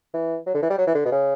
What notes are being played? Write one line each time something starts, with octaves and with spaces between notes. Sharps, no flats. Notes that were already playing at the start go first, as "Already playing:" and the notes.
E3
F#3
D3
E3
G3
F#3
E3
D3
B2
C#3